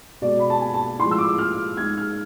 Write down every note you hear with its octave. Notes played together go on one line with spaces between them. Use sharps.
B2 G#3 D5
B5
A5
G#5
A5
A2 F3 G#3 C6
E6
D6
F6
G#2 G#3 G#6
F6